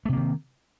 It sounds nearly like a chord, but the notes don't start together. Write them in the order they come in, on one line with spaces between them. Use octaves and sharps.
A3 C3 A#3 D#3